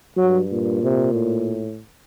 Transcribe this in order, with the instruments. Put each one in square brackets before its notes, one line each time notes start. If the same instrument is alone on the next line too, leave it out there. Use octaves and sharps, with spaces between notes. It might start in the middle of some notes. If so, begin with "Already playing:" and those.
[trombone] G2 [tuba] F#3
[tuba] A#2
[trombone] C3
A2